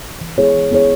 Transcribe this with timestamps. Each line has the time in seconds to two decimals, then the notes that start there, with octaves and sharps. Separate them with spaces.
0.21 E3
0.38 B3 E4 G#4 C#5
0.54 E3
0.71 B3 E4 G#4 C#5